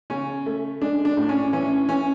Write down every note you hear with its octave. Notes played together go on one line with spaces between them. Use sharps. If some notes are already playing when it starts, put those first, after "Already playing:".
C#3 C#4
A3
G#3 D4
D4
A2
C#4
E3 C#4
E3 C#4